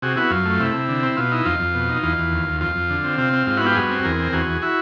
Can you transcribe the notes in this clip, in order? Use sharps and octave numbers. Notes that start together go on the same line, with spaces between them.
C3 F#4 G#4
B3 E4 F#4
F#2 F4
A3
C3 E4
C3
D3
C4
B2 F4
D#4 E4
F2 F4
F2
B2
D#4
E2 F4
E2
D#2
D#2
F2 F4
F2
D3
C4
C3 F4
C4
G#2 F4
B3 E4 F#4
F4 G4
G2 F#4 G#4
C4
E2 G#4 A#4
C4
E2 F#4 G#4
E2
E4 F#4